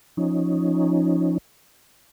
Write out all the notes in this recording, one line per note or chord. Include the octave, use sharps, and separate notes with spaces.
F3 C#4 D#4